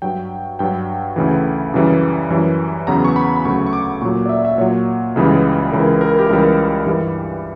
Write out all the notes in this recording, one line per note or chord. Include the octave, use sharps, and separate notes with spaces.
G2 F#3 G5
G2 F#3 G5
D2 C#3 E3
F#2 C#3 E3 G3
F#2 E3 G3
E2 C#3 F#3 A#5
C#6
B5
B5
D2 C#3 F#3 C#6
C#6
D6
A#2 F#3 C#6
D5
E5
E5
A#2 F#3 C#5
C#2 C#3 E3 G3
C#2 C#3 E3 A#4
A#4
G4
C#2 C#3 E3 G3 A#4
G2 E3 G3